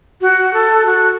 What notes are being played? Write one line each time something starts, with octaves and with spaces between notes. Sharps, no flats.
F#4
A4
F#4